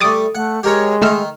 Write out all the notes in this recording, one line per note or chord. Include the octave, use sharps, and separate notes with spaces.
G3 A3 D6 D#6 A6
A3 F#5
G#3 G4 A#4 C#5
D#3 A3 D#4 E6 F6